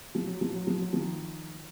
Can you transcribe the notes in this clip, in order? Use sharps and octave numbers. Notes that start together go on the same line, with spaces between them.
F3
F#3
F3
F#3
F3
F#3
D#3 F3